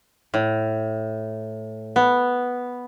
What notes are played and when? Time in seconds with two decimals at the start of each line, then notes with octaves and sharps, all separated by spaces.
0.34 A2
1.96 B3